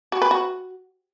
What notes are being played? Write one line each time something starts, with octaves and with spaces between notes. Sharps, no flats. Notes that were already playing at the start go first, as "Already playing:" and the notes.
F#4
B4
F#4